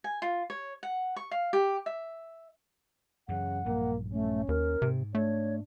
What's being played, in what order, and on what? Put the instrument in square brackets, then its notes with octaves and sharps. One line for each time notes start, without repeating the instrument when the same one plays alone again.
[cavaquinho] G#5
F4
C#5
F#5
C#6
F5
G4
E5
[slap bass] F#2 E3 [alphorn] C#3 [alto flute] F#5
[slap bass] A#1 G2 F#3 [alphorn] A#3
[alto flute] A3 [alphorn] C#4
[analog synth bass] D#2 [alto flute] A#4
[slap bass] G#2 [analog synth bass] C3
[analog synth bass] A3 [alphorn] D4 [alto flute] C#5